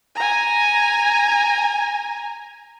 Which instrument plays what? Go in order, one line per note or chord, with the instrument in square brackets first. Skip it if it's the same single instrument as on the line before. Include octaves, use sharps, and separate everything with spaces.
[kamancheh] G#5 A#5